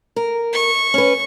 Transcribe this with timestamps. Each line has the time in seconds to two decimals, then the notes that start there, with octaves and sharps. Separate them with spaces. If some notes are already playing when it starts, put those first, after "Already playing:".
0.16 A#4
0.53 C#6
0.94 C#4 B4